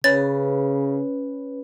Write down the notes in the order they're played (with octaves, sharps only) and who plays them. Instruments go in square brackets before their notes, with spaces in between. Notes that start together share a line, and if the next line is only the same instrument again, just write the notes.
[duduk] C#3 [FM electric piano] C#4 B4 [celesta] C#5 [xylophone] A6